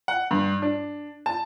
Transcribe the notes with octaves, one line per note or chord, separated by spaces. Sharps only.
F#5
G2
D4
A5